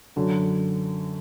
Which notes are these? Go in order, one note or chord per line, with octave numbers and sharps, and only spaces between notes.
F#2 D3 F#3